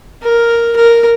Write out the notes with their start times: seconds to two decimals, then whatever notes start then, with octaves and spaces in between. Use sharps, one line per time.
0.23 A#4
0.76 A#4